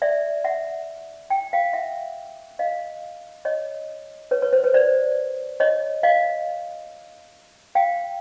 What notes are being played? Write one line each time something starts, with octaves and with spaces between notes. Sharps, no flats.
D5 E5
E5 F#5
G5
F5 G5
E5 F#5
D#5 F5
C#5 D#5
B4 C#5
B4 C#5
C5
B4 C#5
C5 D5
C#5 D#5
D#5 F5
F5 G5